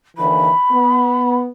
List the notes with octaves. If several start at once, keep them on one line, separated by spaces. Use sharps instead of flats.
D#2 D3 E3 B5
B3